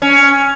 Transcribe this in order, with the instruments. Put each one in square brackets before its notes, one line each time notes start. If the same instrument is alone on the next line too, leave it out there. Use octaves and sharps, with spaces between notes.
[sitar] C#4